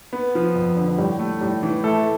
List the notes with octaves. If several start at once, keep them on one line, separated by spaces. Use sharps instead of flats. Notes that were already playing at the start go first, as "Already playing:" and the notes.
B3
F3
F2
D3
A2 G3
A3
A2 G3
E3
A3 A4